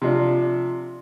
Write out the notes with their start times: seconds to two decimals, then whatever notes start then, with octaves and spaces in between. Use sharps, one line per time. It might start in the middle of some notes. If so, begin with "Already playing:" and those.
0.02 C3 F3 D4